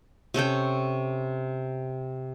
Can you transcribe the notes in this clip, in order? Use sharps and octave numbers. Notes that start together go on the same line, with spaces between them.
C3 C#4 A4 G5